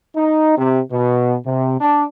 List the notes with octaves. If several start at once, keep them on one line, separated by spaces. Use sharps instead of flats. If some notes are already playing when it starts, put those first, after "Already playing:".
D#4
C3
B2
C3
D4